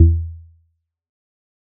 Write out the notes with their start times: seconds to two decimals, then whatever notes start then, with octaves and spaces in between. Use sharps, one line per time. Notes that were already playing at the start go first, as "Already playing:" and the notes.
Already playing: E2